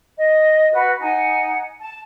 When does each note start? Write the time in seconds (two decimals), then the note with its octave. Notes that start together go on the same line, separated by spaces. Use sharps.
0.17 D#5
0.72 F#4 B4
1.00 D#4 F#5 G#5
1.79 A5